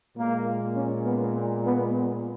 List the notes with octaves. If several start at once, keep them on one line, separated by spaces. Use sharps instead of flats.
A#2 G#3 A#3
C#4
B3
B3
B3